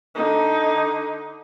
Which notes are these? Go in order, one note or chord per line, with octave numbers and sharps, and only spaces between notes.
D3 D#4